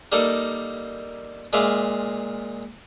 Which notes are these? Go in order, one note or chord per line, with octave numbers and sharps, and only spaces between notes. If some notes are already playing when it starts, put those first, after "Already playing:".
G3 A#3 D#4 A4 D5
A#2 G#3 E5 F5 D6